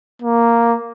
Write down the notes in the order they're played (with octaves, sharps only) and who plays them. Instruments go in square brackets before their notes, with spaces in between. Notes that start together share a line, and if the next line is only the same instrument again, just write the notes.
[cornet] A#3